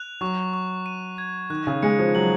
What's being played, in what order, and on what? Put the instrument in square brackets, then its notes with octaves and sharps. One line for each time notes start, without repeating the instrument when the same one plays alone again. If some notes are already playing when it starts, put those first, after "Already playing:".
Already playing: [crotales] F#6 F7
[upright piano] F#3 [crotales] C#6
[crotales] C#6
D#7
G#6
[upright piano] D#3 [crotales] F#6
[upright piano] C#3
[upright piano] G#3 [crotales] C#7
[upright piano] F3
[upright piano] F#3 [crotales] F#7